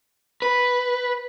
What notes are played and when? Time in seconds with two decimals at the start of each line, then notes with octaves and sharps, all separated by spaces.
0.42 B4